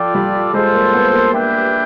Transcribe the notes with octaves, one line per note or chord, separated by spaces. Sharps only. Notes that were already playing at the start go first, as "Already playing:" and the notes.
Already playing: F3 F4 A4 D5 G5
G3
G#3 F4 A4 C5
A#3
B3
A#3
D4 G4 B4 E5 G5